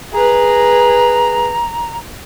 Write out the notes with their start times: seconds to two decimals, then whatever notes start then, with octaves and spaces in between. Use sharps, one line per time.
0.13 G#4 B4 A#5